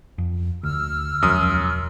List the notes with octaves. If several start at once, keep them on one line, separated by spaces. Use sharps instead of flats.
F2
D2 E6 F6
E1 C#2 F#2 F3 D#6